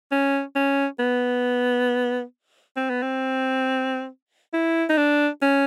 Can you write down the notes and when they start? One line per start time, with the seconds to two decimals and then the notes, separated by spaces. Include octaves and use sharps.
0.12 C#4
0.56 C#4
0.99 B3
2.76 C4
2.90 B3
3.02 C4
4.54 E4
4.89 D#4
4.98 D4
5.42 C#4